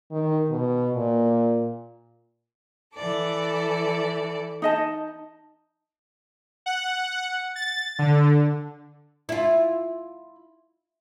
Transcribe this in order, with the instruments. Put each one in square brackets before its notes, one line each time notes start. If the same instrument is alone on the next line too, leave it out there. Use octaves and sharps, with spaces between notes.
[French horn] D#3
B2
A#2
[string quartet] E3 A4 D5
[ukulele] D#4 D#5 A5
[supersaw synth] F#5
A6
D3
[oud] E4 F4